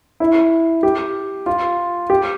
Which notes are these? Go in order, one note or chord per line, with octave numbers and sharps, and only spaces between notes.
E4
G4
F4
G4